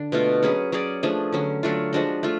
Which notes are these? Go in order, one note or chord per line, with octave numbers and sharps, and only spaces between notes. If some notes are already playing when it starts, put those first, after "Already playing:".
Already playing: D3 D4
B2 A3 F4
F#3 C#4 G#4 B4
F#3 C#4 G#4 D5
F3 A3 D4 G#4
D3 F#3 C#4
F#3 A3 D4 F4
F3 G#3 D4 F#4
A3 F4